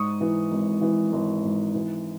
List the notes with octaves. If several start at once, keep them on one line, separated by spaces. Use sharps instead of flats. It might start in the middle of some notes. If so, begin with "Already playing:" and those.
Already playing: G#2 C#6 D#6
E3
G#1
E3
G#1
G#2
E3